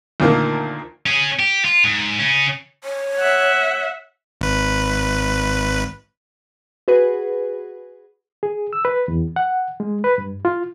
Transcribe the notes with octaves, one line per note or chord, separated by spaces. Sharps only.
D2 A#2 D#3 A#3
C#4 G#4
G4
F4
G#2
C#3 C#4
C#5
E5 F#5
G#1 B4
F#4 G#4 B4
G#4
E6
B4
E2
F#5
G#3
B4
G2
F4